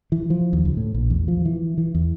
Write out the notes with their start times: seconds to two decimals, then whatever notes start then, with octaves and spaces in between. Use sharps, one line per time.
0.12 E3
0.30 F3
0.53 D#2
0.65 C#2
0.77 A2
0.94 A#1
1.10 E2
1.28 F3
1.45 E3
1.78 E3
1.95 E2